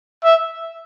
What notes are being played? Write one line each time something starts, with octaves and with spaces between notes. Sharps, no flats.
E5